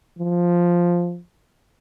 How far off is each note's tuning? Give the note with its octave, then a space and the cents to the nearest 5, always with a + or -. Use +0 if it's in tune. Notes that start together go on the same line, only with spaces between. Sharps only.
F3 +0